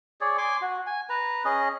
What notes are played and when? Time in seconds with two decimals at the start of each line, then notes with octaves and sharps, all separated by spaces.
0.21 G#4 C#5 D5
0.38 G#5 C6 D6
0.61 F#4
0.87 G#5
1.09 B4 A#5
1.45 C#4 G#4 D#5